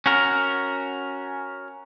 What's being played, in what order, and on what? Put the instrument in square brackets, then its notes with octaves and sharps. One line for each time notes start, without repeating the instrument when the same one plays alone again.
[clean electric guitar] C#4 F#4 A#4